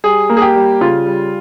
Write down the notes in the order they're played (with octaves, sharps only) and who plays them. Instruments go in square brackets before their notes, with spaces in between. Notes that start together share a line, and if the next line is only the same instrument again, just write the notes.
[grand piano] G3 G#4
A#3
G#4
G4
G3
C#3 F4
G3